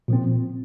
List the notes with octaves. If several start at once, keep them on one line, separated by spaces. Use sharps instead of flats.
A#2 F3 C4